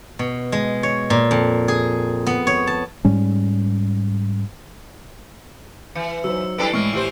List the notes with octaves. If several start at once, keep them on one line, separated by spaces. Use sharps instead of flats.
B2
G#3
C#5
A#2
F2
G#4
B3
C#5
A5
G#2 G3 C#4
E3 C#7
F#3 D#4 C5 E6
G3 D4 E4 A4 B4 C7 D7
A2 E3 G#3 C#6 F6
E3 E4 F4 G4 C5